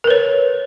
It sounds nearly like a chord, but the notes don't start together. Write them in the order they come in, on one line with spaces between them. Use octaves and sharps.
A#4 B4 C#5